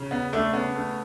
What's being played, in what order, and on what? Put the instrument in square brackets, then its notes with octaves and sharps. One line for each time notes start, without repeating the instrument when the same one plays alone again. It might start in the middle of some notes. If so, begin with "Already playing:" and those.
Already playing: [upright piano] C#3
[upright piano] C#3 [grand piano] B3
[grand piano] A3 [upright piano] D4
[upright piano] C#3 [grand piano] B3
[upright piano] A3